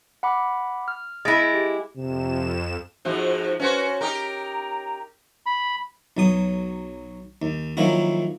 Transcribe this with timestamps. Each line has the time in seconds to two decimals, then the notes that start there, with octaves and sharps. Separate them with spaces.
0.23 F#5 B5 D6
0.88 F6
1.25 G#3 E4 A6 A#6 D7
1.54 G4
1.96 F2 C3 E7
3.05 F2 G#2 F3 F#4
3.60 C#4 F#4 B4 C5
4.01 D#4 G4 A#4 A#5
5.46 B5
6.17 B1 F#3 D#6
7.42 D#2
7.77 D#3 F3 F#3 A#3 E4 F#4